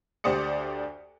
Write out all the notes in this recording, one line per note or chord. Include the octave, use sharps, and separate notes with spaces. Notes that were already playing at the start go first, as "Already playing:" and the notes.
D2 G4 C5 D5 D#6 C#7